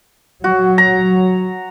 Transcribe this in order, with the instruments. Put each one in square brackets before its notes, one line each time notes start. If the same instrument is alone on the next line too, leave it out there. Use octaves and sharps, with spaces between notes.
[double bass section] F#3 [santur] F#4
[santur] A#5